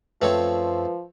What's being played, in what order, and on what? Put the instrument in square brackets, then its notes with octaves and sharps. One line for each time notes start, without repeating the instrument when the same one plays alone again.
[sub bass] F#2 [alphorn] F3 [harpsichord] A3 C4 C#5 [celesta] B4